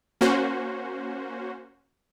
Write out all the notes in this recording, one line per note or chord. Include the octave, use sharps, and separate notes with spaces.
A#3 C#4 F#4 C5